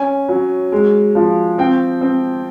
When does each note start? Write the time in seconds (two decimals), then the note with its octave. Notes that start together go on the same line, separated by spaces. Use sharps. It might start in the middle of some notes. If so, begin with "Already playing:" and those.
Already playing: C#4 G#5
0.29 F#3
0.72 G#3
1.15 F3
1.58 C4 G5
2.01 C4